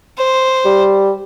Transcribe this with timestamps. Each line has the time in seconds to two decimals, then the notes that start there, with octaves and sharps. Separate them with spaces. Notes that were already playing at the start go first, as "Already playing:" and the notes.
0.18 C5
0.65 G3